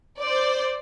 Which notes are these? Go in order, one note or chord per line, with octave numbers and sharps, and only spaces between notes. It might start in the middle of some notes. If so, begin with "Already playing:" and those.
C5 D5